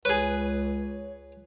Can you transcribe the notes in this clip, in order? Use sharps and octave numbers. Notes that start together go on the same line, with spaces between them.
C#2 G#4 B4 C#5